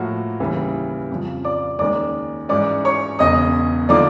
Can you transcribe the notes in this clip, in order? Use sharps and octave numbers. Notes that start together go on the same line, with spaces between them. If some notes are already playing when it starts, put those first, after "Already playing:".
Already playing: A2 F3 A#3 F#4
D#2 C#3 E3 G3
F2 C#3 F3
D5 D6
D#2 D#3 G#3 C#4 D5 D6
G#2 E3 G#3 C#4 D5 D6
C#5 C#6
E1 E2 C#3 D#5 D#6
D3 F3 A#3 D#4 D5 D6